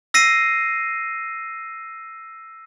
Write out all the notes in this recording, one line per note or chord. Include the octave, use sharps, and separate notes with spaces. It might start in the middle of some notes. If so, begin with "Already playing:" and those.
E6 A#6 C7 D#7